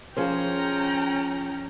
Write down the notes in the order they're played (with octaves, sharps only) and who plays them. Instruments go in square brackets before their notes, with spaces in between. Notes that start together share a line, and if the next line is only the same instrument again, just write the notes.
[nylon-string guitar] F3 G#4 C5 [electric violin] C#4 [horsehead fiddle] G5 A#5